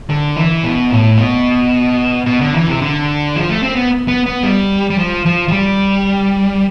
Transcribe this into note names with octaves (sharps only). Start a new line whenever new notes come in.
D3
E3
B2
A2
B2
B2
D3
E3
C3
D3
F3
A3
C4
B3
B3
B3
G3
G3
F3
F3
F3
G3